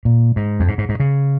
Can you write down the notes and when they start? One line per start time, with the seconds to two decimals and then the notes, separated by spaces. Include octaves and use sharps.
0.05 A#2
0.36 G#2
0.60 F2
0.68 G#2
0.78 G#2
0.89 G#2
1.00 C#3